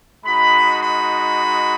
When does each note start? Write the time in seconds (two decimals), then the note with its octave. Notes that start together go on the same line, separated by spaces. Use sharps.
0.24 G#3 D#4 F#4 B5
0.80 B5